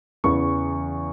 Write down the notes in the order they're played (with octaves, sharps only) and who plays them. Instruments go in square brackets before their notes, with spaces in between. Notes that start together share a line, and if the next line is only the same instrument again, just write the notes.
[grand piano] E2 C#3 E3 B3 C#6